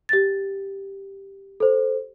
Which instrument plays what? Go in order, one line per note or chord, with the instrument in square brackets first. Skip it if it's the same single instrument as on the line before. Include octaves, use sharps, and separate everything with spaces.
[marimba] G4 A6
[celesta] A4 C5